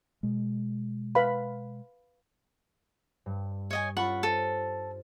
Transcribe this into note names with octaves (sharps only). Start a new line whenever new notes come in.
B2 G#3
B4 F5 B5
G2
C#5 D#5 G#5
C#4 F4 A4 F#5 B5 C#6
A4 C5 D#7